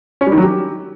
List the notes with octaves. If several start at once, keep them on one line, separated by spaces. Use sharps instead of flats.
C#4
G3
D#3
F#3
G4